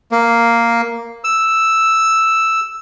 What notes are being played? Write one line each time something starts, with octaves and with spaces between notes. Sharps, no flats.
A#3
E6